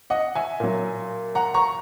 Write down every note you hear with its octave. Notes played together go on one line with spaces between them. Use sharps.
D#5 F#5
E5 G#5
A#2 F#3
F#5 A#5
A#5 C#6